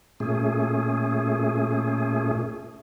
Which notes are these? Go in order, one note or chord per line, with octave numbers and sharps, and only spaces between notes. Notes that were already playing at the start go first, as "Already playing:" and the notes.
A#2 A3 C#4 G#4